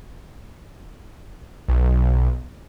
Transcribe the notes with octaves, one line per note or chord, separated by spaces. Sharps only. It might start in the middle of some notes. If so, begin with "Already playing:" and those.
B1